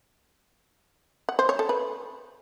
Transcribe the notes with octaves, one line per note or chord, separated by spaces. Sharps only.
F#5
C5
C#5
A4
B4